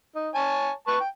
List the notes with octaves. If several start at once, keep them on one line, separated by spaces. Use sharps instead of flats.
D#4
C#5 G#5 A5
B4 A5 C#6
G5